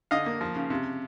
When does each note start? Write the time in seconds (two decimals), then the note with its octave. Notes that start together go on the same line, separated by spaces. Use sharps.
0.11 D3 D#5 F5
0.26 A#3
0.41 F3
0.56 C#3
0.70 C3